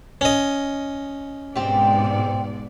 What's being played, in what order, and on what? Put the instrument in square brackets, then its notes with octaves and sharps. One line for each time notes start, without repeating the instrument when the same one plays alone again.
[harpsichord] C#4 D#5
[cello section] G#2 B2 D5 [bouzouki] C4 G4